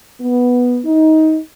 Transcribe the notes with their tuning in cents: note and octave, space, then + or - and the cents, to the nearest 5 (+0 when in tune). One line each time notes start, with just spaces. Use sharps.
B3 -5
D#4 +20